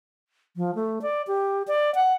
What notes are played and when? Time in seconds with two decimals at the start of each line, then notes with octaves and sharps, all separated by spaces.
0.57 F3
0.75 A3
1.02 D5
1.27 G4
1.68 D5
1.95 F#5